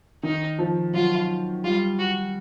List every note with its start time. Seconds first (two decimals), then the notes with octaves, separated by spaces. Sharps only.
0.23 D#3 D#4
0.59 F3
0.94 F#3 F4
1.64 G3 F4
1.98 F#4